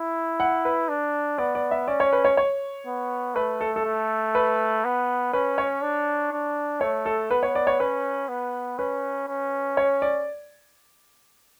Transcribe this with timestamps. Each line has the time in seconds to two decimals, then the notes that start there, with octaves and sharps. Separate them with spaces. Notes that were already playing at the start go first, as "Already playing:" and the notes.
Already playing: E4
0.40 F#5
0.65 B4
0.89 D4
1.38 B3 D5
1.55 D5
1.71 E5
1.88 C#4 D5
2.00 C#5
2.13 B4
2.25 C#5
2.37 C#5
2.87 B3
3.35 A3 B4
3.61 A4
3.76 A4
3.85 A3
4.35 B4
4.84 B3
5.33 C#4 B4
5.58 C#5
5.82 D4
6.32 D4
6.81 A3 C#5
7.06 A4
7.31 B3 B4
7.43 C#5
7.55 D5
7.67 C#5
7.80 C#4 B4
8.29 B3
8.78 C#4 B4
9.28 C#4
9.77 C#5
10.02 D5